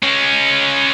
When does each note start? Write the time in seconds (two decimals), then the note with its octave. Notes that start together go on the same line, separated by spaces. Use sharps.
0.03 G#3 C#4